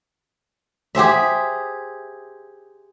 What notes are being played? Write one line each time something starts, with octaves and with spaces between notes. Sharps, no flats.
G4 G#4 C5 E5